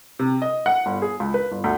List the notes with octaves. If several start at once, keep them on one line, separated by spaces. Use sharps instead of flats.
C3
D#5
F#5
G1
G#4
C#2
B4
G1
D2